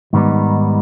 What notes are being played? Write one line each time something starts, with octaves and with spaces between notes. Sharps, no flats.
G#2 D#3 G3 B3 D#4